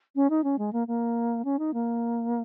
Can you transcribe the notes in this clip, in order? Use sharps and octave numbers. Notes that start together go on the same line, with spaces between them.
C#4
D#4
C#4
G#3
A#3
A#3
C#4
D#4
A#3